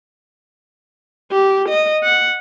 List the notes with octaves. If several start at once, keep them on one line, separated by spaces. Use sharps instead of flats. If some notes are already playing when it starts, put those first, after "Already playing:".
G4
D#5
F#5